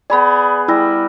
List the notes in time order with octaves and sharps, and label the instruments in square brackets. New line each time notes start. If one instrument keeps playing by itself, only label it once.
[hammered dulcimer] B3 G#4 [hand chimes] D5 B5
[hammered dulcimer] G3 [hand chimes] E4 E6 A#6